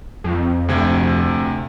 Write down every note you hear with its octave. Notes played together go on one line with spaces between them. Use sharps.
F2
D2 C3 G#6